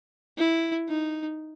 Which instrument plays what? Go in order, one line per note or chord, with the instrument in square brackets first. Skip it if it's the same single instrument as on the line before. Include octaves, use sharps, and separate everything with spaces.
[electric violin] E4
D#4